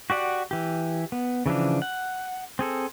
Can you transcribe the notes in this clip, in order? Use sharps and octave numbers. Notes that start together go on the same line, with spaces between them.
F#4 G4 D5 F#5
E3 G4
B3
C#3 E3 F3 D4
F#5
C4 G#4 A4